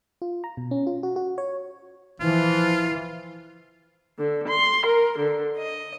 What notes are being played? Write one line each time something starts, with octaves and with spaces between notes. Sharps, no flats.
F4
A#5
B2
C#4
F4
F#4
F#4
C#5
E3 F3 F4
D3
C6
A#4
D3
D#5